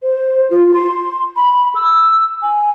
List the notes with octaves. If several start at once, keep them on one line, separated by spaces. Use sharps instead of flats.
C5
F4
C6
B5
E6
G#5